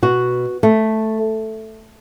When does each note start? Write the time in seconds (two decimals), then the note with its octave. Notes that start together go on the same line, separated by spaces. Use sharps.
0.02 B2 F#4
0.63 A3